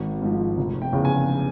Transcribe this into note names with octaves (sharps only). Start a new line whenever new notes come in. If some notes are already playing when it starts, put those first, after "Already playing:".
Already playing: G#1
G#2 F3
F1
G5
E2 C#3
G#5